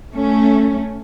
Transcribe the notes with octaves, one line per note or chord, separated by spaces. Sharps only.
A3 C#4